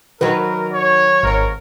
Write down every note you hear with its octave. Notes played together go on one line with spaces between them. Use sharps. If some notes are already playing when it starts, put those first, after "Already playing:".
D#3 F#3 F#4 A#4 B4
C#5
G#1 A#4 C#5